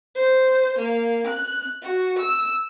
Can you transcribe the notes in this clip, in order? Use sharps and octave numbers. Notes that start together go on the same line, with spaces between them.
C5
A#3
F#6
F#4
E6